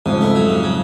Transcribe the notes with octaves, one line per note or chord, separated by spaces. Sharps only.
F2 G#2 C#3
A3
F#3
C#3
F#3